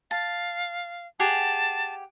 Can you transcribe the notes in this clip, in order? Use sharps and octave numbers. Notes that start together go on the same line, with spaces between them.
F5 A5
G4 G#4 F#5 A5